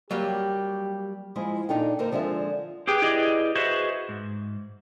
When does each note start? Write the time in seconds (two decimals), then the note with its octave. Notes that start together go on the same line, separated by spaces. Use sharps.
0.11 F#3 G3 A#3 G4
1.36 F3 G#3 E4
1.69 A#2 D4 D#4 A4 G5
1.99 D3 A#3 A4 A#4 C5
2.12 D3 F3 G#3 D4 A4 E5
2.87 G4 G#4 B4 G5
3.02 E4 G4 G#4 B4 D5 D#5
3.55 F#4 G#4 B4 C5 D#5 E5
4.09 G#2